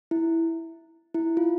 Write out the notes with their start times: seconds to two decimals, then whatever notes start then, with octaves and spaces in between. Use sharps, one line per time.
0.11 E4
1.14 E4
1.37 F4